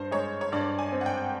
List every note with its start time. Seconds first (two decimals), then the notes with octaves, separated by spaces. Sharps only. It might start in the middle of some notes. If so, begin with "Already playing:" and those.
Already playing: G2 C5
0.11 G#3 C#5
0.41 C#5
0.52 G2 D5
0.79 G#5
0.92 C4
1.01 F#5
1.06 G5